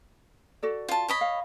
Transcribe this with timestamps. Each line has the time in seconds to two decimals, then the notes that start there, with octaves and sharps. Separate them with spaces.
0.63 F#4 A4 D5
0.89 F4 A5
1.08 C#5 D#5 B5
1.21 F5